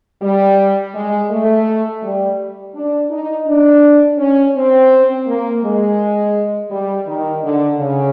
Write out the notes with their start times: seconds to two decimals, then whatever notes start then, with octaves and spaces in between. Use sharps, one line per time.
0.22 G3
0.94 G#3
1.30 A3
2.02 G3
2.75 D4
3.10 D#4
3.46 D4
4.18 C#4
4.55 C4
5.27 A#3
5.63 G#3
6.70 G3
7.06 D#3
7.43 D3
7.78 C#3